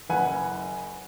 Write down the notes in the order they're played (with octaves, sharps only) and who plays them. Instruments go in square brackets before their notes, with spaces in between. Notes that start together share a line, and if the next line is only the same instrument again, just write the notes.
[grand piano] F#1 B4 F#5 G#5